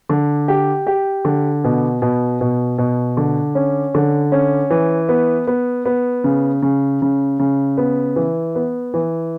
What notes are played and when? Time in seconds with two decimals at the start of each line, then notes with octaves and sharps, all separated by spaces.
0.09 D3
0.48 G4
0.87 G4
1.25 D3
1.64 B2
2.02 B2
2.41 B2
2.78 B2
3.17 D3
3.55 C#4
3.95 D3
4.32 C#4
4.70 E3
5.09 B3
5.47 B3
5.86 B3
6.24 C#3
6.62 C#3
7.02 C#3
7.39 C#3
7.78 B3
8.16 E3
8.55 B3
8.94 E3